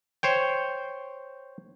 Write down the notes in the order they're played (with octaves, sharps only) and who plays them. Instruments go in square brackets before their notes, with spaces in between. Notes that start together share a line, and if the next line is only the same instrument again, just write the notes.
[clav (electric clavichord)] C5 C#5 G5